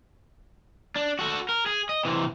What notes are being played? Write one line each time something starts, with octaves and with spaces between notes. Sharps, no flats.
D4
F#4 A4
A#4
G#4
D#5
C3 E3